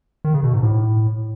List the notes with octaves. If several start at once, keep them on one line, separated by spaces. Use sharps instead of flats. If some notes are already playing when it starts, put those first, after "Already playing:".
D#3
C#3
B2
G#2
A2